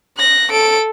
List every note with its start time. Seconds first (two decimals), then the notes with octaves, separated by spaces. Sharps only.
0.17 F#6 A#6
0.52 A4 D7